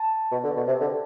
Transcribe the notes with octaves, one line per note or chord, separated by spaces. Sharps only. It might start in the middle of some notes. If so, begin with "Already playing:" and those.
Already playing: A5
B2
D3
B2
C3
D3